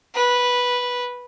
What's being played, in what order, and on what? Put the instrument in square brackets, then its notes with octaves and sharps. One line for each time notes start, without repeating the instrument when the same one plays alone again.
[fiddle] B4